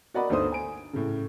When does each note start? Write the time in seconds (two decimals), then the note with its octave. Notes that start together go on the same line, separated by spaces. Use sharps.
0.14 F#4 A#4 D5 D#5 F#5 B5
0.29 G1 D2 A3 D#4 C5 D#6
0.52 G#5 D7
0.93 A2 C#3